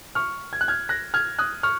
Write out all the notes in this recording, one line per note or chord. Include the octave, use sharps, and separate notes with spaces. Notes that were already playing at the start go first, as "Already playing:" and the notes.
C#6 F6
G#6
F#6
F6 G#6
F#6 A#6
F6 G#6
D#6 F#6
C#6 F6